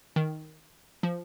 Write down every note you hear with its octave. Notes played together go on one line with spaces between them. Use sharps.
D#3
F3